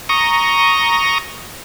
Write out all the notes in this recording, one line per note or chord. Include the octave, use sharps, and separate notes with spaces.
A#5 C#6 D#6